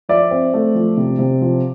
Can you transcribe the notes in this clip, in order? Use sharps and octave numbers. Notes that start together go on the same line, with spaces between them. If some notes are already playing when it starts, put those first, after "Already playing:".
F3 D5 E5
C4
A3
F3
C3
C3
F3